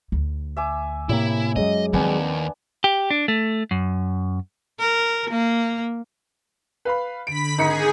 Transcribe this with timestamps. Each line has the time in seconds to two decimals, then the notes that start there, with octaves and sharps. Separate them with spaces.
0.12 D2
0.57 E5 G#5 D6
1.09 A2 C3 A#3 E4
1.56 F#2 F#3 G#3 D#5
1.93 D#2 F3 B3 C4 D4 G#5
2.84 G4
3.10 D4
3.28 A3
3.71 F#2
4.79 A#4
5.30 A#3
6.85 B4 F5 B5
7.27 D3 B5 B6 D7
7.58 G#1 D#4 G#4 C#7